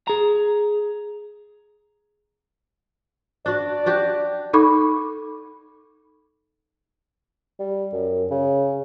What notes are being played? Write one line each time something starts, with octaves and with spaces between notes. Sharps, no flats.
G#4 A#5
D4 F#4 D5
D4 F#4 G4
D#4 A4 B5 C#6 D6
G3
F#2
C#3